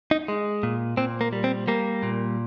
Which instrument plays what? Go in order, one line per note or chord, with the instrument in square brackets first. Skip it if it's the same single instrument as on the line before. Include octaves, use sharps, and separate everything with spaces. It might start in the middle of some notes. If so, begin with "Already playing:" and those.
[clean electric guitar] D#4
G#3
A#2
A#2 C4
A#3
G3
C4
G3 A#3
A#2